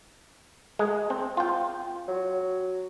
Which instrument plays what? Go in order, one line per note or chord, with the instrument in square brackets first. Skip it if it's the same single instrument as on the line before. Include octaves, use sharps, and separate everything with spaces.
[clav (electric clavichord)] G#3
C4
F4 G5
[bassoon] F#3